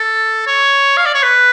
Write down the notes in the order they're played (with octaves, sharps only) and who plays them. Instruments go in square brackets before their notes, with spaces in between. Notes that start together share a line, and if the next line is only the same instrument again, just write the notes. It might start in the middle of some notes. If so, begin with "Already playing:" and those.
Already playing: [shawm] A4
C#5
F5
D5
C#5
B4